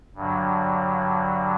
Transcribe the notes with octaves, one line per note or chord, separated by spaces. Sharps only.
G2 D3 F#3